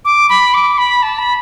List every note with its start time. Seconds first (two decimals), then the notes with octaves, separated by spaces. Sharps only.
0.05 D6
0.29 B5
0.54 D6
0.78 B5
1.03 A5
1.19 B5